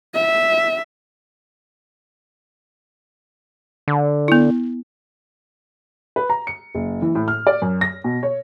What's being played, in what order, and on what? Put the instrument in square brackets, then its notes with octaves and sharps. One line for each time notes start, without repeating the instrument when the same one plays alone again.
[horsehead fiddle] E5
[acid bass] D3
[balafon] B3 E4
[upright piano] B4
A#5
C#7
F#1
E3
A2
F6
D5
F#2
A#6
B2
C#5